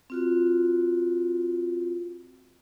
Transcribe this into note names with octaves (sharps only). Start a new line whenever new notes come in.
C4 F4 F#4